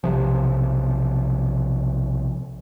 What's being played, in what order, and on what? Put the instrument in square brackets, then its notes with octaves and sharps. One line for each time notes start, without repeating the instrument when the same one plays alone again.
[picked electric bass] B1 C3 F3